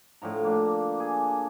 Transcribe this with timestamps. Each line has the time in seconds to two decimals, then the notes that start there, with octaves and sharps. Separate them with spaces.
0.22 A2 D3 F3 A#5
0.44 A#3 D4
1.00 G#4